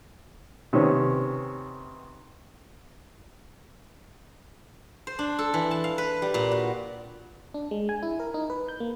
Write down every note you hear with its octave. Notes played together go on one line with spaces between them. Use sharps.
C3 D#3 B3 C#4
C5
D4
A4
E3
A5
F5
B4
G3
A#2
F#4
D4
G#3
G#5
E4
A#4
D#4
B4
G6
A#3